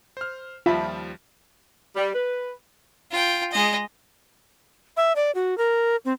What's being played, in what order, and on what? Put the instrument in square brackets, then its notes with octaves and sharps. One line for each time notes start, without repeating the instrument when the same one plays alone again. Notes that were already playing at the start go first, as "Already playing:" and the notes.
[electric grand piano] C5 F6
[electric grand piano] D#2 F3 G3 [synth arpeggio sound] F4 [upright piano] E5 A5 B5
[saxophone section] G3
B4
[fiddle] F4 G5
G#3 D#5
[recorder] E5
D5
F#4
A#4
C4